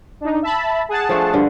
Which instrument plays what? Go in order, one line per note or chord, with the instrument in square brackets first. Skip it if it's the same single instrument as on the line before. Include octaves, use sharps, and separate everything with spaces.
[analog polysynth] D4 D#4
E5 A5 B5
G#4 F#5 A5
[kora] F3 A3 D4
G2 D3 G#4